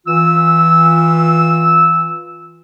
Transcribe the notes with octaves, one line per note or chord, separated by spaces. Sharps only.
E3 F4 E6